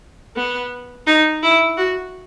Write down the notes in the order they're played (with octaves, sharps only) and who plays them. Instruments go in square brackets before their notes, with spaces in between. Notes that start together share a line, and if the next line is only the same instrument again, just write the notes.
[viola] B3
D#4
E4
F#4